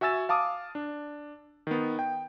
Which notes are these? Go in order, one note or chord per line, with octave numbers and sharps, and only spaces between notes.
F#4 E5 G#5 E6 A6 E7
F5 A5 D6 D#6
D4
D#3 B3
G5